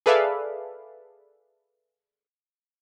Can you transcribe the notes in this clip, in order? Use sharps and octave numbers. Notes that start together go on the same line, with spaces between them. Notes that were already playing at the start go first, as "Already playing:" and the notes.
G#4 A4 B4 D5 E5 F5